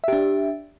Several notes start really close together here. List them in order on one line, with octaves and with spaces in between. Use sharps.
E5 G4 D4